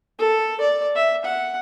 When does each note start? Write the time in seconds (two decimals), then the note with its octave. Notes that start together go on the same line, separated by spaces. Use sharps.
0.19 A4
0.60 D5
0.95 E5
1.25 F#5